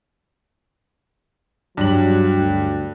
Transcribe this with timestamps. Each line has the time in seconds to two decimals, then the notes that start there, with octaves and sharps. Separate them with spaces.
1.77 G2 F#3 F#7
2.36 D2